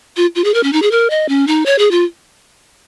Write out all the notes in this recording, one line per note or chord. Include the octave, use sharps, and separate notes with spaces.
F4
F4
G#4
A#4
C#4
D#4
G#4
A#4
D#5
C#4
D#4
C#5
G#4
F4